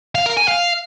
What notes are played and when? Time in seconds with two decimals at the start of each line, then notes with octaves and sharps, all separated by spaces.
0.15 F5
0.26 A#4
0.37 G#5
0.48 F5